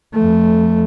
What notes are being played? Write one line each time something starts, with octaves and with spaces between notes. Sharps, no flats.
F2 A3